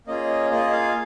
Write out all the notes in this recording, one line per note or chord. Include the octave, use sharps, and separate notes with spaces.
A#3 C#4 F4 G#4 D#5
A#3 F4 G#4 D#5
F5